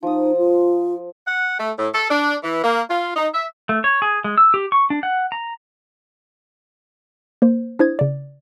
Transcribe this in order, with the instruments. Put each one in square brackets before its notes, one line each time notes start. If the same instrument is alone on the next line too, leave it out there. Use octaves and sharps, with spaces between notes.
[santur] F3 D#6 [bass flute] D#4
[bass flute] F4
[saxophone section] F#5
A3
A2
A4
D4
E3
A#3
F4
D#4
E5
[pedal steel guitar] A3
C#5
G#4
G#3
E6
G4
C#6
D4
F#5
A#5
[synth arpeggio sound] A#3 C5
D4 E4 C5 D#6 G#6
C#3 D5